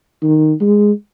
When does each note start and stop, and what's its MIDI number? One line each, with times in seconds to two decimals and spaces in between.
0.22 0.52 51
0.61 0.92 56